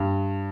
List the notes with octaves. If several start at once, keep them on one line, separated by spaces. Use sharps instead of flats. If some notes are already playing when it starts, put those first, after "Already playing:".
Already playing: G2